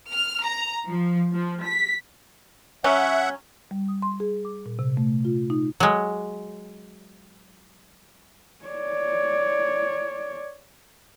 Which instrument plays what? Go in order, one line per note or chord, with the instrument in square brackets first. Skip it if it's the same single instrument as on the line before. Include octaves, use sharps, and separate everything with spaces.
[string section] F6
A#5
F3
F3
B6
[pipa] F#3 C#4 [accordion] E5 F#5
[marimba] G3
D#6
C6
G#4
D6
A#2
C3
A3
F4
D#4
[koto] F#3 G#3
[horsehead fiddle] C#5 D5